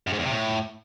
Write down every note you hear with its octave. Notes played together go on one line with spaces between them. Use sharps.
F#2
G#2
E2
C3
A2